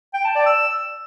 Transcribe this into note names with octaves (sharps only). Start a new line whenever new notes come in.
G5
A5
D5
E6